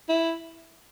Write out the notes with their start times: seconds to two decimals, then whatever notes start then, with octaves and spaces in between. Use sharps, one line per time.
0.09 E4